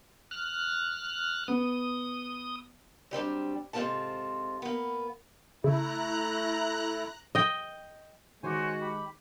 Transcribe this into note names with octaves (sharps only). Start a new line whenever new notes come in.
F6 F#6
B3 D#6
F#3 G3 C4 D4
G#2 C3 C4 F4 A4 A5
A#3 B3
C#3 A3 E4 A#5 F#6
D#5 G5
D#3 G#3 F#4 C5 C#5 G#5 D6
G4 B5